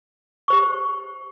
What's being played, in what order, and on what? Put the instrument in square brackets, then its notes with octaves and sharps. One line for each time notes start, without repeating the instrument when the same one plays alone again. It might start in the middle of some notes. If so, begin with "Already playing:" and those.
[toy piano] G4 C5 C#6